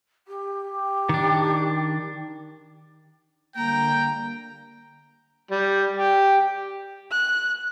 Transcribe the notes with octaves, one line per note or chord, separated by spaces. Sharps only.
G4
D#3 D4
D3 G3 A#3 G5 A#5
G3
G4
F#6